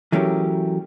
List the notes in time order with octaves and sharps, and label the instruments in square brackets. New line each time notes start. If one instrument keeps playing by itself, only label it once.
[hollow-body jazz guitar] E3 F#3 A3 C#4 G4 A#4